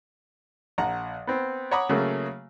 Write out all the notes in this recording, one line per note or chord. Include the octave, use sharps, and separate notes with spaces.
A#1 F#5 A#5
B3 C4
C#5 F#5 A#5 B5 D6 D#6
C#3 F#3 A3 A#3